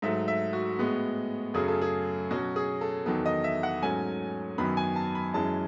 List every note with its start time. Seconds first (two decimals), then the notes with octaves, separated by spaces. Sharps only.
0.02 G#2 F#3 A3 E5
0.28 E5
0.53 F#4
0.79 A2 G#3 B3
1.54 F#2 C#3 F#3 A3 C#4 G#4
1.68 A4
1.81 G#4
2.31 B2 F#3 C#4 F#4
2.56 G#4
2.81 A4
3.06 E2 D#3 F#3 B3 A4
3.26 D#5
3.44 E5
3.63 F#5
3.83 G#2 F#3 A3 C#4 G#5
4.58 F#2 D#3 F#3 B3 B5
4.77 G#5
4.96 A5
5.15 B5
5.34 F#2 E3 G#3 C#4 A5